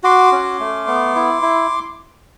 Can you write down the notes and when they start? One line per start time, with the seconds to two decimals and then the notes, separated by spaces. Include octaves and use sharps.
0.03 F#4 C6 D6
0.32 C#4
0.60 A3
0.87 B3
1.15 E4
1.42 E4